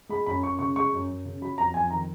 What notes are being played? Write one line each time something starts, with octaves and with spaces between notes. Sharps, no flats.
G#3 B5
F#2 B5
F#2 C#6
C#3 C#6
G#3 C#6
F#2
F#2
C#3
F#3 B5
F2 A#5
F2 G#5
D#3 A#5